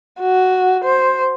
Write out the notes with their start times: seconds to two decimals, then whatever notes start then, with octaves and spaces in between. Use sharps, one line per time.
0.20 F#4
0.84 C5